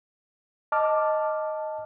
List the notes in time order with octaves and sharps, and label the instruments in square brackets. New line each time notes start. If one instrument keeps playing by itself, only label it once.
[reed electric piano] D#5 A5 D6 F6